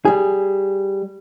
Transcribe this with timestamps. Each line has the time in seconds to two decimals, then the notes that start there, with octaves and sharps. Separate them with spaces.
0.05 G3 G#4